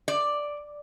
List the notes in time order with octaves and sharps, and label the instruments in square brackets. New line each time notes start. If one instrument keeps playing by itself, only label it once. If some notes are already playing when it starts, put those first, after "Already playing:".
[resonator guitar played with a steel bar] D5